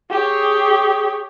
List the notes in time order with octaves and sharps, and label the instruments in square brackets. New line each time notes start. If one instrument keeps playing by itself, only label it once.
[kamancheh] G4 C#5 [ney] G#4